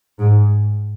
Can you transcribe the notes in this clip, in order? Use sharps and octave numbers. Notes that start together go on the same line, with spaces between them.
G#2